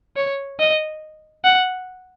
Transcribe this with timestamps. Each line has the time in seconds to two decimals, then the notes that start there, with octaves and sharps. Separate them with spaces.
0.16 C#5
0.60 D#5
1.44 F#5